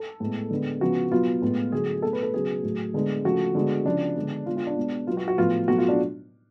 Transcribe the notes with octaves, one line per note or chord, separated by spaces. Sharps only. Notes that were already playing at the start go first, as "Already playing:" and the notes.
Already playing: A4
A2 G#3 B3
D3 G#3 B3
C#3 F3 B3 F#4
B2 F#3 B3 F4
A2 G#3 B3
D3 F#3 A3 G#4
B2 A3 A4
B4
A4
C#3 F#3 B3 G#4
A2 F#3 A3
D3 G#3 B3
C#3 F3 A3 F#4
D3 G#3 B3
C#3 F3 B3 D4
D3 G#3 B3
D3 G#3 B3 F4
F4
D4
B2 G#3 B3
B2 F#3 B3 F4
F#4
F#4
A2 F3 B3 F4
B2 F#3 A3 F#4
F4
D4